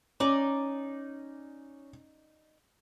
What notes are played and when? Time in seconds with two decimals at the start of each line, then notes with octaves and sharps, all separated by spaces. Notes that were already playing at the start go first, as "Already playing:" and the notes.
0.20 C#4 D#4 D5